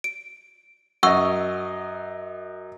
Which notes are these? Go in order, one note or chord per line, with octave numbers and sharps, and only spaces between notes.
D7
F#2 D#5 F#5 C#6 E6